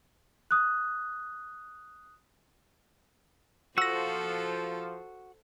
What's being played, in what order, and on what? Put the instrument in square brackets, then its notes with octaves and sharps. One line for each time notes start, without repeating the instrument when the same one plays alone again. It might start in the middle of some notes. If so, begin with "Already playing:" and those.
[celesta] D#6 F#6
[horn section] F3 [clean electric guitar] F#4 [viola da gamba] A4 C5 [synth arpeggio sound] E6 A#6